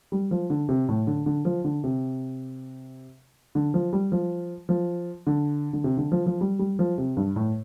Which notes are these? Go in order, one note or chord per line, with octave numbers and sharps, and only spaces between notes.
G3
F3
D3
C3
A2
D3
D3
F3
D3
C3
D3
F3
G3
F3
F3
D3
D3
C3
D3
F3
F3
G3
G3
F3
C3
G2
A2